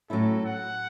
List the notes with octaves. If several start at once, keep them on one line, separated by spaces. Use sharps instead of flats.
A2 F#3 C#4 E4 A4
F#5